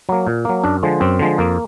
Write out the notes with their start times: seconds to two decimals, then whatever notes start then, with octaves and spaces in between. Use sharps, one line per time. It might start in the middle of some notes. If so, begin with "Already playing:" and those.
0.09 F#3 A#3
0.27 A#2
0.45 F#3 A#3
0.64 F#2 D4
0.83 D3 F3 G#3
1.01 F#2 C4
1.19 D3 F3 G#3
1.38 F2 A#3